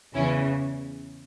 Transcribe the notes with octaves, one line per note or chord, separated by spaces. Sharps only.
E2 C#3 E3 C#4 E4